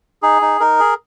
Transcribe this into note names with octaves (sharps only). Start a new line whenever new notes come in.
D#4 G#4
D#4
D#4 A#4
G#4